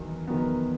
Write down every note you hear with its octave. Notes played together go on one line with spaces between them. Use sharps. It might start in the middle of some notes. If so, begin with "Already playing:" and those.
Already playing: E2 D#3 F#3 B3
E2 D#3 F#3 B3